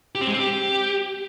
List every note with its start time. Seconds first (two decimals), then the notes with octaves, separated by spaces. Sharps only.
0.15 G4
0.21 C4
0.27 G#3
0.33 C4
0.39 G4